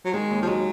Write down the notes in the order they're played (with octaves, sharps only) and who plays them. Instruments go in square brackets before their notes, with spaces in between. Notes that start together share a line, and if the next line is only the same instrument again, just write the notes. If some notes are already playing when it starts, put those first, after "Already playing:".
[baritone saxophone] F#3
[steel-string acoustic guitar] D#3 [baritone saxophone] G#3
[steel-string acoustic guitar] D#2
[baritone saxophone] F3
[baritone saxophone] F#3 [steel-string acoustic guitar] G#3